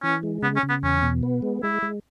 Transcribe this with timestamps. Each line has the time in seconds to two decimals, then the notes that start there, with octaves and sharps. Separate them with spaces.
0.03 E3 C#4
0.23 G#3
0.42 C#3 B3
0.56 C#4
0.63 C#3
0.69 B3
0.83 E2 C#4
1.02 B2
1.23 B3
1.42 G#3
1.63 G#3 E4
1.82 G#3